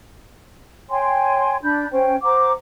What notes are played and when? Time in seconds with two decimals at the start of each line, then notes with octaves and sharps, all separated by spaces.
0.89 C#5 G5 G#5 C6
1.63 D4 B5 G6
1.92 C#4 C5 G5
2.23 C5 F#5 A#5 D6